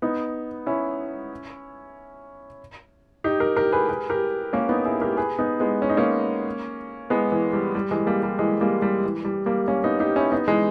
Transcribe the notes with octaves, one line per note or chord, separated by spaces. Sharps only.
B3 D#4
C#4 E4
D#4 G4
G4 A#4
G4 A#4
G#4 B4
G#4 B4
G4 A#4
A#3 C#4
B3 D#4
E4 G#4
G4 A#4
G#4 B4
B3 D#4
G#3 B3
C#4
D#4
A#3 C#4
G#3 B3
E3
G3
G3
E3 G#3
G3 A#3
G3
E3 G#3
G3 A#3
G3
E3
G3
G3 A#3
A#3 C#4
B3 D#4
D#4 G4
C#4 E4
B3 D#4
E3 G#3